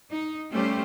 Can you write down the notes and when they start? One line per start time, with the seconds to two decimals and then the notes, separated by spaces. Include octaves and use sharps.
0.11 D#4
0.50 G3 A3 C#4 G4 C5